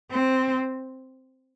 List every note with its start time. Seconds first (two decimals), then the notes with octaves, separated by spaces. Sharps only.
0.11 C4